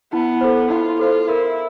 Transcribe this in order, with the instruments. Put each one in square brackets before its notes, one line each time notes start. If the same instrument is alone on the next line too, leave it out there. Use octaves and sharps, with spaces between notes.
[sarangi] B3 [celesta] E4
[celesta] A4 C5
[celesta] E4 [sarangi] F4
[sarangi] F4 [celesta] A4 C5
[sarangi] E4 [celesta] A#4